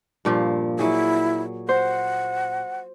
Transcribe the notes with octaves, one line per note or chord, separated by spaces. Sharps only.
G2 A#2 F3
F#3 E4 G#4
C5 F#5